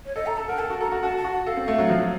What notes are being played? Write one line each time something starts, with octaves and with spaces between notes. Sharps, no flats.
C#5
A4 D#5
A4 A#5
A4 A5
A#4 F#5
A4 A5
F#4
A4 A#5
F#4
F#4 A5
A5
F#4
F#5
A4 F5
C4
A3
F#3
F3
F#3